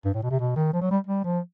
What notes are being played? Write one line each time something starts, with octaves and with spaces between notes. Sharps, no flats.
G2
A2
B2
C3
B2
D#3
F3
F#3
G3
G3
F3